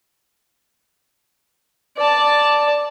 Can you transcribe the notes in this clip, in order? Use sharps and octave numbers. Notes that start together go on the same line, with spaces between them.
D5 A5